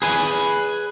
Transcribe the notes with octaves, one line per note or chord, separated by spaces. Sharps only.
G#4 B4 G#5